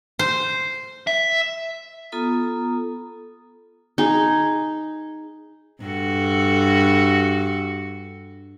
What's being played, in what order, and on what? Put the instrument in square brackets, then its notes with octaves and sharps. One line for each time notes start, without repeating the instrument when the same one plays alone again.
[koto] C5
[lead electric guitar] E5
[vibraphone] B3 F4 A4 A#5 D#6
[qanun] D#4 G#4
[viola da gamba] G2 F#4 A4